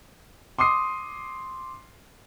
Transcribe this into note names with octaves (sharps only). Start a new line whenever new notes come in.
C6 D6 D#6 C7